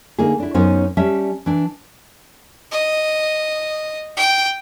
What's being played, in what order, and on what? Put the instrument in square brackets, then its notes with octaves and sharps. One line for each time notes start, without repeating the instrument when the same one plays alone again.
[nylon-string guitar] D3 A#3 D#4 G#4
D4 E4
F#2 B3 C#4 D#4 C5
G3 C#4 E5 A5
E3 D4
[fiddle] D#5
G5